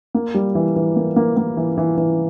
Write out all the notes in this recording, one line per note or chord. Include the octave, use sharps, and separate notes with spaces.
A#3
G3
E3
E3
A#3
A#3
A#3
E3
E3
E3